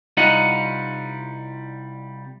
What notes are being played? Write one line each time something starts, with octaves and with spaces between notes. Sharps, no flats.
C2 G3 D#4 F4 D#5 F#5